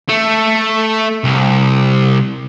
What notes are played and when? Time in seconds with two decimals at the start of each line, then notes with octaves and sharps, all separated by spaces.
0.09 A3
1.24 C2